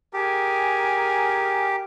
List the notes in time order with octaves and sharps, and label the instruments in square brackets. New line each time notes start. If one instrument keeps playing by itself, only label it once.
[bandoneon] G4 [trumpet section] G#4 A#4 G#5